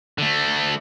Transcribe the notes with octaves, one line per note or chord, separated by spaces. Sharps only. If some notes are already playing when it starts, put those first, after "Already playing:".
D3 A3